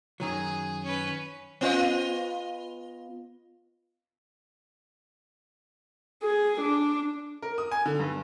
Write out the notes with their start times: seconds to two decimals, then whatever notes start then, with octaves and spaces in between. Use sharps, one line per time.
0.20 F#2 D#3 F#3 G#4
0.83 C#4 B4
1.61 B3 F4 D#5
6.23 G#4
6.61 D4
7.42 A#4
7.58 D#6
7.71 G#5
7.86 D3
7.99 G2